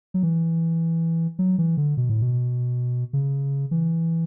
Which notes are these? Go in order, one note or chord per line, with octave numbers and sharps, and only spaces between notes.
F#3
E3
F#3
E3
D3
B2
A2
B2
C#3
E3